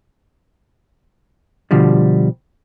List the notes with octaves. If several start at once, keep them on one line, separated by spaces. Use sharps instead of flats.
B2 D3 F3 G3